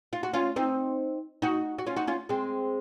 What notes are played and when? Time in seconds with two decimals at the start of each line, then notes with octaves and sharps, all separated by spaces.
0.13 F4
0.23 F#4
0.34 C#4 F4
0.56 C4 D#4
1.42 D#4 F#4
1.79 F#4
1.86 C#4 F4
1.96 D#4 F#4
2.07 C#4 F4
2.29 G#3 C4